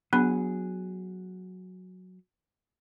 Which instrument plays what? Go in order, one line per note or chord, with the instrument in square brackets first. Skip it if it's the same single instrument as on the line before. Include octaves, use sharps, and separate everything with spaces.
[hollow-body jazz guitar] F#3 G#4 [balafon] B3 D4 B5